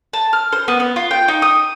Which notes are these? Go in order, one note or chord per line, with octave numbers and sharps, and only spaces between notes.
A5
F6
C5
B3
B3
F4
G5
D#4
D#6